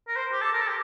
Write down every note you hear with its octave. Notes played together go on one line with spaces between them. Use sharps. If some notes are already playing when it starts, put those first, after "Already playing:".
A#4
C5
G4
A4
A#4
A4
G4